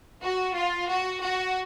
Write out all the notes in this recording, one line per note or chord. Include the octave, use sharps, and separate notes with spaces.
F#4
F4
F#4
F#4